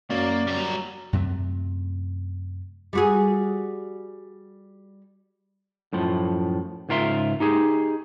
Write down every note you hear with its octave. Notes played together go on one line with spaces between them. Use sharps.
F#2 F#3 A#3 D5
G3 A#5
F#2 C3 F#3 A3
G3 F#4 G#4
F#2 A2 F3
C#2 G#2 F4 A#4 E5 C6
D#4 G4 G#4